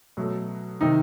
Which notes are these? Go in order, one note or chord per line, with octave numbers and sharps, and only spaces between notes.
B2 F#3 A3
C3 D#3 D#4